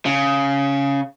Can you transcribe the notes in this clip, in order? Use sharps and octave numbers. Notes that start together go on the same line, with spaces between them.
C#3